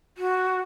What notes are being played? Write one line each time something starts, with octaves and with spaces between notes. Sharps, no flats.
F#4